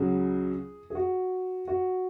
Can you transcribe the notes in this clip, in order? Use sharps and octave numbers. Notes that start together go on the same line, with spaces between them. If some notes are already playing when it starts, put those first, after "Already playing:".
Already playing: C#2 C#3 F#3 G#4
G#4
F#4
F#4